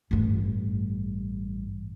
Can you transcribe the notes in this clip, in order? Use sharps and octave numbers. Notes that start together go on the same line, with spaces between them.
A1 G2